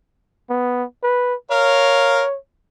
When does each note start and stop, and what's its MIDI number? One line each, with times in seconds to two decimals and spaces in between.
0.50 0.84 59
1.03 1.34 71
1.51 2.23 70
1.51 2.37 73
1.51 2.23 77